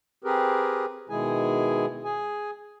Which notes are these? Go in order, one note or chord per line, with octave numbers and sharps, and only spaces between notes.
C4 G4 G#4 A#4 B4
B2 D#3 G#3 E4 G#4 G#5
G#4 G#5